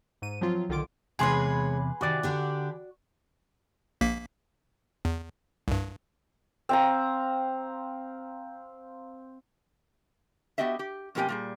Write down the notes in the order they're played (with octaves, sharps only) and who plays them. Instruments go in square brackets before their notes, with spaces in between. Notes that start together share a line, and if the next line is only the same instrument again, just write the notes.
[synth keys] G#2 D#7
F3 F#3 C4 F4
B1 D3 D#3 F4 D6 D7
[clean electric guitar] E2 C3 [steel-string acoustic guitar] G#3 C#5 [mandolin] G#4 B4 C6
[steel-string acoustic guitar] C3 D#3 [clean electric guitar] F#4 D5
[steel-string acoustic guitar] D3 D4 G4
[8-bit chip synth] A#1 A#3 B6
E2
C2 G2
[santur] C4 F5 A#5
[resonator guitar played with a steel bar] B3 F#4 G4 D#5 E5
G4
F2 B2 A#3 G4 G5 G#5
A#2 G3 G#4